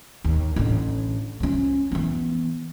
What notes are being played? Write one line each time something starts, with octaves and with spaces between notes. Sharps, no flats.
D#2
A1 D3
F3 C#4
E3 B3